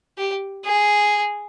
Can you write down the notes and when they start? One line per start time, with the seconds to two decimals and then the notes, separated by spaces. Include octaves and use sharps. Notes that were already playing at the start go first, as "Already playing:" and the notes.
0.18 G4
0.65 G#4